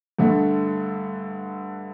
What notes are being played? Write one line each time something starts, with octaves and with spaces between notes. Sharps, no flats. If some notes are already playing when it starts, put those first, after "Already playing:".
G2 D3 A3